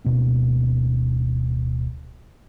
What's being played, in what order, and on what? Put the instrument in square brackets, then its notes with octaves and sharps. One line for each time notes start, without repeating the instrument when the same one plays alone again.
[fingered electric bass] D1 B2 A#3 C4